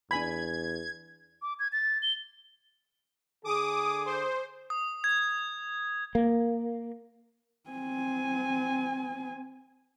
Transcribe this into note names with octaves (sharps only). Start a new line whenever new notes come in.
E2 D4 G#5 B5 G#6
D6
G#6
A6
G7
D3 G#4 D6 D#6
C5
D#6
G#6
A#3
C4 G#5